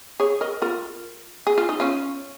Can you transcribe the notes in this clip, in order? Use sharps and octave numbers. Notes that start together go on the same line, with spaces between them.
G#4 C#5
A#4 D#5
F4 A#4
G#4
F4
D#4
C#4 F4